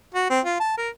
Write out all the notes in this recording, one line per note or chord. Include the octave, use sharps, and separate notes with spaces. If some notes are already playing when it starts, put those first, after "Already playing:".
F#4
C4
F4
A5
A#4